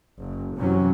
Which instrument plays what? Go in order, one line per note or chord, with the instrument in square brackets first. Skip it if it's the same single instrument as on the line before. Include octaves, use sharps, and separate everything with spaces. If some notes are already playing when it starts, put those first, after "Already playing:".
[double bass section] F#1
F#2 C3 E3 F#3 C#4